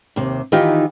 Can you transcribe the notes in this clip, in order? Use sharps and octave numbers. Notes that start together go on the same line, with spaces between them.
D#2 C3
D#3 E3 D#4 F4 G4